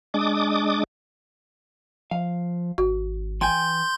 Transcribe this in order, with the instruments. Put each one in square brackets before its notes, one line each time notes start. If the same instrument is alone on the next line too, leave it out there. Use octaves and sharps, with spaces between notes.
[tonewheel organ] G#3 D4 D6 D#6
[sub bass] F3 [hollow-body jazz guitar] F5
[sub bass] G#1 [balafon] F#4
[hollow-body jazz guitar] E3 G5 G#5 [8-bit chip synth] C6 G6